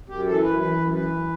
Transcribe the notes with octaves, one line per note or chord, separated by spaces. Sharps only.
F#2 G4
E3 A4
F#2 B4
E3 B4
F#2
E3 B4
F#2